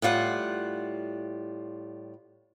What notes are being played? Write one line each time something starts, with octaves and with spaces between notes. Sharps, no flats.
A2 G3 F4 F#5